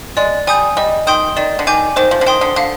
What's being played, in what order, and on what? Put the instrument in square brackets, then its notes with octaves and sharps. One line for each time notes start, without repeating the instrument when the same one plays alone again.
[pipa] G#3 [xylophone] D5
[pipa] G3 [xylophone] G#5 D#6 G6
[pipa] G3 [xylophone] D#5
[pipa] D#3 [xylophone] G5 C6 D#6 G6
[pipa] D#3 [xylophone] D5
[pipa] D3
[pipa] D#3 [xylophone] G#5 D6 G6
[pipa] D#3 [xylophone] C5
[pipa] F3
D3
[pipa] D#3 [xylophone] G5 C6 D#6
[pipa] D3
[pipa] D3 [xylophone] F5